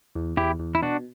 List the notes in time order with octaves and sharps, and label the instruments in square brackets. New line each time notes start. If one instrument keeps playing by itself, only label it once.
[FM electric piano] E2
[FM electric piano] E2 [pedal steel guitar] E4 G4
[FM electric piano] E2
[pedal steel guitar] E4
[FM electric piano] B2 [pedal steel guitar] D4 F#4